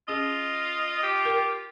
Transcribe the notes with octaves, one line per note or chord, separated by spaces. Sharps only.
C#4 F4 G#4 D#5
G4
A#4 G5